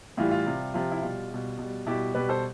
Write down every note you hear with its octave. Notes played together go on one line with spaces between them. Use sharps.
A2 E3 G3 F4
F4
C3 G3
C3 F3 F4
E4
B2 G3 F4
B2 G3
B2 G3
B2 G3 E4 G4
B2 G3 G4 B4
A4 C5